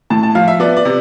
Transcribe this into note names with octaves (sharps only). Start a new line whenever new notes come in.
A2 A5
A5
F3 F5
E5
B3 D5
D5
C3